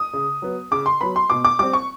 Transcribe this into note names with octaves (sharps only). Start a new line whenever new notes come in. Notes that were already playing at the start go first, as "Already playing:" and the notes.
Already playing: D#6
C#3
F#3 B3
C#3 D6
C6
F#3 B3 B5
C6
B2 D6
D6
G3 C4 D6
C#6